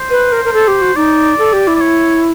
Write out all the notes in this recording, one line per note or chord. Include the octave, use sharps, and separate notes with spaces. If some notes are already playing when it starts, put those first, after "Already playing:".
Already playing: C5
B4
A#4
A#4
A4
G4
F#4
D#4 D5
A4
G4
E4
D5
C#5